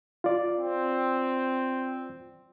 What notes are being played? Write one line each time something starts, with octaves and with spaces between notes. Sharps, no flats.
F4 D5
C4